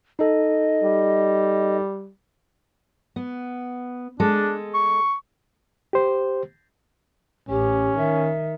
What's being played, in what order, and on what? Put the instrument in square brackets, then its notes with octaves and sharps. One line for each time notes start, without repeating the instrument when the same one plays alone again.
[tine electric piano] D#4 A4 [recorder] D#5
[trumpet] G3
[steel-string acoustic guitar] B3
[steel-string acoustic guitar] G#3 A4 [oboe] D4
[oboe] C#6
[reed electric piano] G4 C5
[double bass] A1 [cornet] C#4 [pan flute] G4
[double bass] D#3 [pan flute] E5